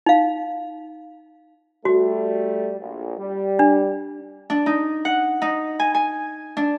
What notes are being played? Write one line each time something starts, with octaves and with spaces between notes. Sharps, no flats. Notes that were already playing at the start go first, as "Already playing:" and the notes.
D#4 F5
G3 A3 F#4
A#1
G3
D4
D4
D#4
F#5
D#4
G#5
G#5
D4